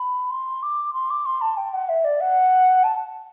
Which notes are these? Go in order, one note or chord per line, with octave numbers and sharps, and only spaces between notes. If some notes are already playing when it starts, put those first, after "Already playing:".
Already playing: B5
C6
D6
C6
D6
C6
A5
G5
F#5
E5
D5
F#5
A5